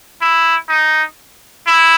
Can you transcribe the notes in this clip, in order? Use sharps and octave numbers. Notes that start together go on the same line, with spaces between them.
E4
D#4
E4